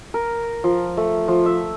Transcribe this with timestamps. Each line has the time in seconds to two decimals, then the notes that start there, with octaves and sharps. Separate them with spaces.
0.14 A#4
0.64 F3
0.97 A3
1.28 F3
1.46 E5